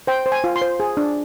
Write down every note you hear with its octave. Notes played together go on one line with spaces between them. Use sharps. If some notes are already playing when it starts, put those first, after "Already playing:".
C5 G5
C5
G#5
F4
C6
C5
G#4
D4